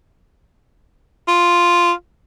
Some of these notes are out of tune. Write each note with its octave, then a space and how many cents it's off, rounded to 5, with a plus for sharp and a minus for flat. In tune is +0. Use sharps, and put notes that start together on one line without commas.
F4 -5